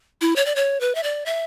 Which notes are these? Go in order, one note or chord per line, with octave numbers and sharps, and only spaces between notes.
E4
C#5
D5
C#5
B4
E5
D5
E5